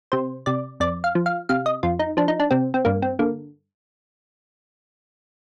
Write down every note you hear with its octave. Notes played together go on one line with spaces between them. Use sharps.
C3 C5
C3 D5
F2 D5
F5
F3
F5
C3 F5
D#5
F2 F4
D#4
F3 D4
D#4
D4
C3 C4
C4
G2 A#3
C4
D3 A#3